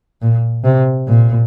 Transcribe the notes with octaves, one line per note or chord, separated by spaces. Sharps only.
A#2
C3
A#2